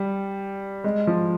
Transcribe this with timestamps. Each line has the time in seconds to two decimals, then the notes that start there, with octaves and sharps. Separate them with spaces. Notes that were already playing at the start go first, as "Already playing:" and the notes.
Already playing: G3
0.84 G#3
1.07 F3